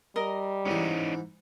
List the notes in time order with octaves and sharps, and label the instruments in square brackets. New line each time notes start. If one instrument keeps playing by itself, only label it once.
[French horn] G3 [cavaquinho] A#4 D#5
[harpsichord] G#2 E3 [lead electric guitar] C#4 D#4